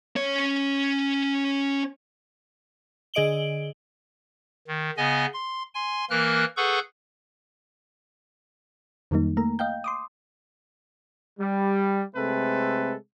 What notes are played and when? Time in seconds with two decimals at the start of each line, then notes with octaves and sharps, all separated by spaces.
0.16 C#4 C#5
3.14 D3 G#4 D#5 D7 F#7 G7
4.68 D#3
4.97 C#3 B3 D#5 G#5
5.33 C6
5.74 G#5 C6
6.10 E3 A#3 A#4 F6 F#6
6.57 G#4 A4 B4 F#5 C#6 G6
9.11 F2 D#3 F#3 G3 A#3 D#4
9.37 A3 A#3 A#5
9.59 D#5 F5 G5 G6
9.84 C6 D6 D#6
11.39 G3
12.15 C3 G#3 A3 C4 A4 B4